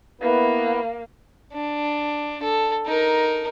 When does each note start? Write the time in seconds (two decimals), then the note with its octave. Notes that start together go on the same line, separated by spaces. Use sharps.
0.21 A#3 B3 E4 B4
1.53 D4
2.43 A4
2.86 D#4 A#4